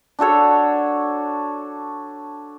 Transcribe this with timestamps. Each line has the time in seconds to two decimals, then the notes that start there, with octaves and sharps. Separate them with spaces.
0.19 D4 F#4 A4 C#5